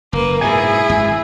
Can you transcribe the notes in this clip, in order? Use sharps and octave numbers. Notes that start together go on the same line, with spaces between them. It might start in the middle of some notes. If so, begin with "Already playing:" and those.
F#1 A#3 B4
G#2 B2 E4 G#4 G#5
G#1 F#2